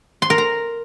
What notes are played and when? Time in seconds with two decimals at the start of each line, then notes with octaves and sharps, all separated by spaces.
0.22 C6
0.30 A#4
0.38 A#5